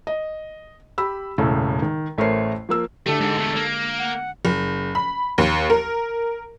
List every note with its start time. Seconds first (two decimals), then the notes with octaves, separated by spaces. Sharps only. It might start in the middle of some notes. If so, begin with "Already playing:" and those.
0.07 D#5
0.98 G4 B5 E6
1.38 E1 A2 C#3 A4
1.82 D#3
2.18 A1 A3 A#4 C5 C#5 C7
2.69 F3 A#3 E6
3.06 D3 A3 G4 A4
3.20 G#2 G#3
3.38 E2 A3
3.56 A#3
3.98 F#5
4.45 F#1
4.95 B5
5.38 D#2
5.70 A#4